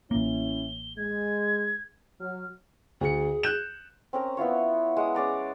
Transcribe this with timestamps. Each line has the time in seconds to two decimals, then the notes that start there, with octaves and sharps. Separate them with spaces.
0.11 A1 A#3 C#4 E4 G7
0.97 G#3 G#6
2.21 F#3 F6
3.01 D2 G#4 C#7
3.43 F#6 G6 E7
4.13 C4 C#4 A#4 A#5
4.37 B3 E4 F4 C#5
4.97 G#3 F#5 D#6
5.15 C#4 G#4 D5 A#5